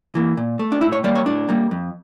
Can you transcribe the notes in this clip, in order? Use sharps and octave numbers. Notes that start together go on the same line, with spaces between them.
E3 A#3
A#2
A3
D4
A2 E4
C#5
G3 A#3 D5
C#5
A2 D4
G3 A#3
F2